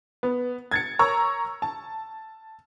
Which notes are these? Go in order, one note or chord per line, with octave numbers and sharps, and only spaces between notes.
B3
G#6 A6 C#7
A#4 C#5 A#5 C#6 E6
A5